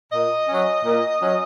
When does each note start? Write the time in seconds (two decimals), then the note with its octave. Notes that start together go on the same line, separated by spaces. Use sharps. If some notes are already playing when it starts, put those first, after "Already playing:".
0.13 A#2 D#5
0.48 F#3 C#4
0.85 A#2
1.20 F#3 C#4